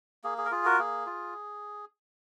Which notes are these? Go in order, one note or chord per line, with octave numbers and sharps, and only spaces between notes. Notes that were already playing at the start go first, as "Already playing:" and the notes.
A#3 G#4
G#4
A#4
F4 G#4
F#4 A#4
A#3 G#4
F4